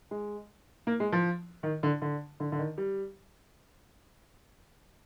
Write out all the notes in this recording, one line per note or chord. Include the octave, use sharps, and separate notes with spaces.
G#3
A#3
G#3
F3
D#3
D3
D3
D3
D3
D#3
G3